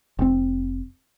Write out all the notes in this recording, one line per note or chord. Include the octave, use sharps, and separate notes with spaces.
F1 A#2 C4